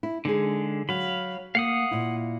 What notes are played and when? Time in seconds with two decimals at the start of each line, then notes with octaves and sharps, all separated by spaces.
0.03 E4
0.25 D3 G#3 D#4 G#4
0.89 F#3 F5 B5
1.55 A#3 F5 F#5 D#6
1.91 A#2 E4